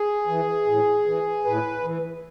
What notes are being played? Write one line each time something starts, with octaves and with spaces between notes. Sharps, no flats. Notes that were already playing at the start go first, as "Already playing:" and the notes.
Already playing: G#4
E3
A2
E3
A2 B4
E3